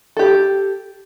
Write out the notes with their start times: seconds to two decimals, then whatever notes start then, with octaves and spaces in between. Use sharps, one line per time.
0.17 G4 A4